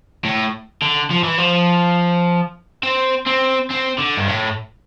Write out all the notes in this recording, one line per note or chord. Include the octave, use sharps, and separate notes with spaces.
A2
D3
F3
E3
F3
C4
C4
C4
D3
G2
A2